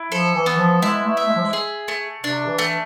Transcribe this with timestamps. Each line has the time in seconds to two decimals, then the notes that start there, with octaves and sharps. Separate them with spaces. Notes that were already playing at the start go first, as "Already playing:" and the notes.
Already playing: E4
0.12 F3 A4
0.35 E3
0.46 B3
0.58 F3
0.82 G#3 E4
1.05 A3
1.17 E5
1.29 G#3
1.37 F3
1.43 G#3
1.53 G#4
1.88 A3
2.23 C3 D4
2.47 E3
2.59 A3